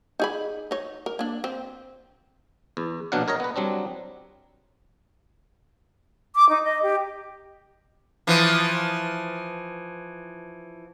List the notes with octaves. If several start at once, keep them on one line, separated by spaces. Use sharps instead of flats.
D#4 G#4 B5
D#4 C#5
A#4
A#3 D4
C4
E2
A#1 B2 F#3 D4 F5 F#5
A#4 C#5 D#5 A#5
B3 B4
F#3 G3 C4 D4
D6
D#4
D#5
G4
E3 F3